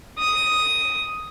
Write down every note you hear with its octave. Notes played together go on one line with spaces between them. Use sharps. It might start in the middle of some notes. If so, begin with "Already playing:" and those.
D#6